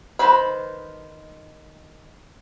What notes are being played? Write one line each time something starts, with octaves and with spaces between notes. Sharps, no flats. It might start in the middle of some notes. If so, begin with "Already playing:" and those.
D#3 B4 C5 B5